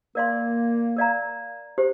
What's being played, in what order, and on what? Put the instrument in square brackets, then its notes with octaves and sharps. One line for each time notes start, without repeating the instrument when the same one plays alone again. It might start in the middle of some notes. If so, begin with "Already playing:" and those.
[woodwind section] A#3 [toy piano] A#4 D5 F5 C6
[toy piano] A#4 D5 F5 A#5
G4 C5